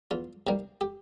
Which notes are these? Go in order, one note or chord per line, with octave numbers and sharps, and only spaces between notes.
E2 F4
C3 D#3 G3 A#3
G4